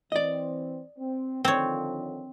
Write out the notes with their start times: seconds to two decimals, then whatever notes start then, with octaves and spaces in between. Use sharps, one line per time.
0.12 E3 C4 D5 D#5
0.99 C4
1.45 D3 D#3 F3 C4 C#5